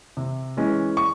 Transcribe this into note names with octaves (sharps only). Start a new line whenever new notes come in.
C3
E3 G#3 C#4
C#6